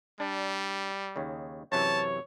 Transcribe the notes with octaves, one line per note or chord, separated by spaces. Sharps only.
G3 D4
D#2 C#3
F#2 C3 E3 C#5 A5